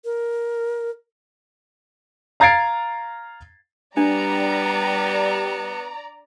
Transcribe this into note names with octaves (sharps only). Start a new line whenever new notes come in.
A#4
F5 A#5 G#6 A6 C7 D7
G3 B3 D4 D5 A#5